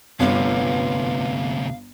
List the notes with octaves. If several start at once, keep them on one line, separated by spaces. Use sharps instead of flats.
G1 D2 C3 F4 B4 C#5 F5